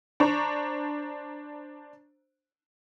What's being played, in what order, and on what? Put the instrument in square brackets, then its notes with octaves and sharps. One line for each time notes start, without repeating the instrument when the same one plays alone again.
[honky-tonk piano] D4 C5 A#5 C#6